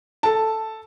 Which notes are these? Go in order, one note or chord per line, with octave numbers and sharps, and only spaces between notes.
A4 A5